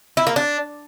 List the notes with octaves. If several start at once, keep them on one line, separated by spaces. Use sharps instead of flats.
E4
A#3
D4